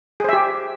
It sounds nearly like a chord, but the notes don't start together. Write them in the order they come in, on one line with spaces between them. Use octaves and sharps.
G#4 C5 E5 G4